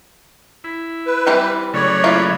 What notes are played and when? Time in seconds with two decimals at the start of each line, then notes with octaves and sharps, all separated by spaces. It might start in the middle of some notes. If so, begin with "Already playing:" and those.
0.64 E4
1.06 B4
1.27 E3 G3 C4
1.74 C#3 F#3 A3 C#5 D5
2.04 A#3 E4 F4